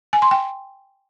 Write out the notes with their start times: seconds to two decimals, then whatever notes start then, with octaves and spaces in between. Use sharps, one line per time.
0.13 G#5
0.22 C6
0.31 G5